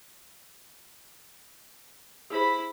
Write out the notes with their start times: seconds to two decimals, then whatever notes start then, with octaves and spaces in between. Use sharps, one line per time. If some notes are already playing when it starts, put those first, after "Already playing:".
2.30 E4 G4 G#4 C5 B5